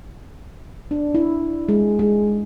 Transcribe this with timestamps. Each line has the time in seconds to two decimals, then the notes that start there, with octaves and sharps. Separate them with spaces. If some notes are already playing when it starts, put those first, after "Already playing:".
0.91 D4
1.15 E4
1.69 G#3
1.99 G#3